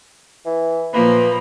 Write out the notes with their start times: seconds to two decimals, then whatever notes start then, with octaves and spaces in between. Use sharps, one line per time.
0.46 E3
0.93 A#2 F3 A#3 B4